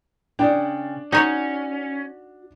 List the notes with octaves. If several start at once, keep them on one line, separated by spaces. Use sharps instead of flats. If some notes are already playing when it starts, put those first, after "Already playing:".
C#3 D4 D5 G5
C#4 D#4 F#4 C#5